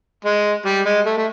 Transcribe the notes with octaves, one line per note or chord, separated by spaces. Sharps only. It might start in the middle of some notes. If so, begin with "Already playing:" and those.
G#3
G3
G#3
A3
A3